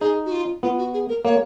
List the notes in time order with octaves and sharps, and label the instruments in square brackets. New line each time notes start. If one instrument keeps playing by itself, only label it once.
[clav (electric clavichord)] D#4 [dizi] G#4
[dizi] F#4
F4
[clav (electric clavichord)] B3 [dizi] F4
[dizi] F#4
G#4
A#4
[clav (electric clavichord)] A#3 [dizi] C#5